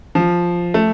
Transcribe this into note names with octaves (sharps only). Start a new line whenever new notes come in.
F3
A3